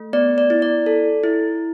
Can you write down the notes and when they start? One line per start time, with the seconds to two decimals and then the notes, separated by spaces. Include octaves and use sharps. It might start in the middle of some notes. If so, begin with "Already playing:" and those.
Already playing: A3
0.13 B3 D5
0.38 D5
0.50 E4
0.62 D5
0.86 A4
1.24 E4